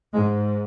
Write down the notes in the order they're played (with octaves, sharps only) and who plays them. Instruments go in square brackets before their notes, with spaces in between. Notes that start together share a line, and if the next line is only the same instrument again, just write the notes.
[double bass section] G#2 G#3